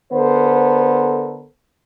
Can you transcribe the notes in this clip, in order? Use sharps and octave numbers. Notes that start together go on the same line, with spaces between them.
D3 B3 A4 A#4 C5